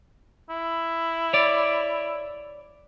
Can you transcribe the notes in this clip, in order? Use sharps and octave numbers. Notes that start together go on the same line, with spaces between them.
E4
C#5 D5